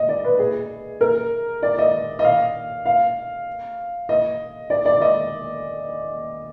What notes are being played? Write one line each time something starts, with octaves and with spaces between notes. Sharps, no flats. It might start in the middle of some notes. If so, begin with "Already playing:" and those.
Already playing: D#5
D5
B4
G#4
A#4
D5
D#5
D#5
F5
F5
D#5
D5
D5
D#5